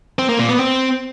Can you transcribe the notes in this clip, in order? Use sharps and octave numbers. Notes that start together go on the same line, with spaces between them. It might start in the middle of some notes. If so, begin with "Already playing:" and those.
C4
A#3
A#2
B3
C4